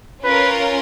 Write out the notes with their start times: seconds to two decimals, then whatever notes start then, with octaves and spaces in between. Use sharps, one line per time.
0.23 C#4 F4 A#4 B4